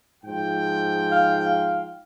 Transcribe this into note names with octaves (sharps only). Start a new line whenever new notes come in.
G#2 F3 G5
F5
F5